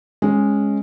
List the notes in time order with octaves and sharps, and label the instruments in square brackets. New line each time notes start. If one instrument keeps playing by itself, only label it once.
[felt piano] G#3 C#4